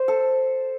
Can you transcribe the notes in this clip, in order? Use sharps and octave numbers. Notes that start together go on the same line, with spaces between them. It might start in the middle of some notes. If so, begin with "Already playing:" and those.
Already playing: C5
A4